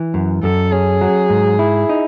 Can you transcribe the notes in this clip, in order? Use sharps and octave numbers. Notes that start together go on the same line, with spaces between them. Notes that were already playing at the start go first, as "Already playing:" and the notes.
Already playing: E3
F#2
F#2 A4
C#4 G#4
F#3
G#2
E4
D#4